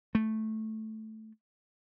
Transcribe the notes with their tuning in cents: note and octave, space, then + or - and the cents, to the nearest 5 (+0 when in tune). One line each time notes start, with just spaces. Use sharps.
A3 -5